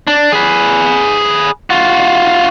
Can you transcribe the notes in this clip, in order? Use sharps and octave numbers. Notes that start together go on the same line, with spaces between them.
D4
G#4 B4
F4 F#4